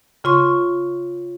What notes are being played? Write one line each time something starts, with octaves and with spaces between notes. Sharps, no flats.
C#3 F4 C6 C#6